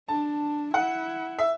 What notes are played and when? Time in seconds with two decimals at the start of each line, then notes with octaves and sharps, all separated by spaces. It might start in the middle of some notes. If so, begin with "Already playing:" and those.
0.09 D4 A5
0.74 E4 F#5
1.39 E5